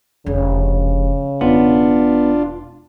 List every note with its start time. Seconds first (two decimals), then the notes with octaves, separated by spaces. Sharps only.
0.26 F1 C#3 D4
1.41 E1 B3 D4 F4